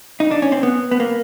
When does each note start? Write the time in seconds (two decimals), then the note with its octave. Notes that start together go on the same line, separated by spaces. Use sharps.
0.20 D#4
0.31 D4
0.42 C#4
0.52 C4
0.63 B3
0.91 B3
1.00 A#3